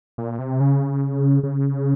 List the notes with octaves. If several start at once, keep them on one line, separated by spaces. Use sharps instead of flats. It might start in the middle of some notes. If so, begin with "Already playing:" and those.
A#2
C3
C#3
C#3